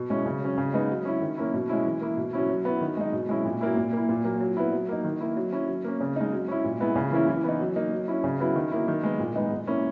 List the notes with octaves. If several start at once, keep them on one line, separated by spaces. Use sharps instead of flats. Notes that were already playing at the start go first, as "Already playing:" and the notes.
Already playing: B2
G#3 C#4 E4
C#3
F#3 C#4
C#3
G#3 B3 D#4
F#3
C#4 E4
D#3
A#3 C#4 E4
B2
G#3 C#4 E4
E3
A#3 E4
B2
F#3 C#4 E4
F#3
B3 E4
D#3
G#3 D#4
B2
G#3 C#4 E4
A#2
F#3 A#3 E4
A#2
A#3 E4
A#2
F#3 A#3
F#3
B3 E4
F#3
A#3 D#4
D#3
A#3 E4
F#3
C#4 E4
F#3
A#3 C#4
C#3
G#3 D#4
F#3
C#4 E4
A#2
G#3 B3 E4
C#3
E3 A#3 C#4 E4
E3
B3 D#4
F#3
A#3 D#4
F#3
C#4 E4
C#3
F#3 B3 E4
D#3
F#3 A#3 E4
D#3
G#3 B3
A#2
G#3 B3 D#4
A#2
A#3 C#4 E4